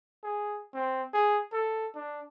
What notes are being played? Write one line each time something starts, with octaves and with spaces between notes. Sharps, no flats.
G#4
C4
G#4
A4
D4